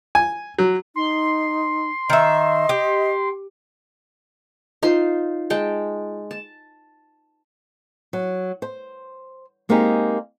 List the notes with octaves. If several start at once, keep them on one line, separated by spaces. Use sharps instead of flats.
G#5
F#3
D#4 C6
D#3 D#5 E5
G4
D#4 F4 C5 C6
G#3 G5 A5
A5
F#3
C5
G#3 A#3 C4 D#4 G4 G#4